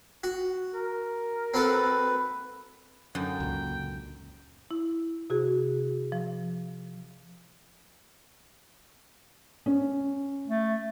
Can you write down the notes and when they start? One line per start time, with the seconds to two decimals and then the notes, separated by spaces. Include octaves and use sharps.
0.24 F#4
0.74 A#4
1.54 C4 F#4 A4 B4
3.15 F#2 D3 D#4 G5
3.40 C#2 A#2
4.71 E4
5.30 C3 F#4 G#4
6.12 F3
9.66 C#4
10.47 A3